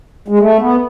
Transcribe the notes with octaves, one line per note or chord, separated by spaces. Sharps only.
G#3
A3
B3